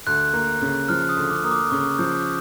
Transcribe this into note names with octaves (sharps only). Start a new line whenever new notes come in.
D2 F#6
A#3
C#3
F3 F6
D#6
D2
D6
A#3 D#6
D6
C#3 C#6
F3 G6